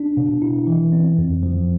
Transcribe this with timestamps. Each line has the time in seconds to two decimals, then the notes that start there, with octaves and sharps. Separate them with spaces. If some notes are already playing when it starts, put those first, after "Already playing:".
Already playing: D4
0.17 B2
0.42 E4
0.67 E3
0.92 C4
1.18 F2
1.43 F3